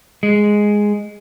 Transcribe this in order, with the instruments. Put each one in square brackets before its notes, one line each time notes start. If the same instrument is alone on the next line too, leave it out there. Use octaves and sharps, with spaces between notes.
[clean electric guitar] G#3